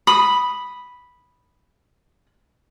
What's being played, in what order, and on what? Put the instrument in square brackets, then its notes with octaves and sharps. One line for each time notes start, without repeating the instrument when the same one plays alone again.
[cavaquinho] B5 D#6